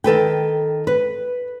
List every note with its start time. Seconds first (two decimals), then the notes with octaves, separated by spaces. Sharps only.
0.04 D#3 A4 B4 G5
0.87 B4